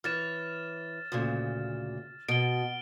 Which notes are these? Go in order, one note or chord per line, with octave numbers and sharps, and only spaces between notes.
E3 C#5 F6 A6 E7
D2 A#2 C#3
B2 D7 G7